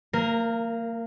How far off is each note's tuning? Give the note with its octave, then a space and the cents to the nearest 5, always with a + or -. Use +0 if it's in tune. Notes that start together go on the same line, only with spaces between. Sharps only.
A#3 -30 A#4 +0